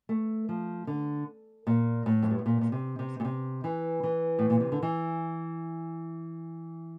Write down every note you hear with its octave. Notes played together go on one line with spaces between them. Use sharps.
A3
F3
D3
A#2
A2
F2
G2
A2
A#2
A#2
C3
C3
A#2
C3
E3
E3
A2
A#2
C3
D3
E3